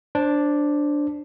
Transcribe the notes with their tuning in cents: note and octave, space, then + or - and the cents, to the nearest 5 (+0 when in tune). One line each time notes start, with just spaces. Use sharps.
D4 +0 C5 +15